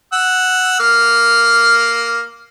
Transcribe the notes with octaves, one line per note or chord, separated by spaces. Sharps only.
F#5 E6
A#3 F6